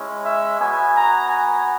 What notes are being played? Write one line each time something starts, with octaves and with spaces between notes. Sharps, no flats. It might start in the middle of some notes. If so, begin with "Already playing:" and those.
Already playing: G#3 C#4 E4
E5
B3 F#4 G#5
A#5
G#5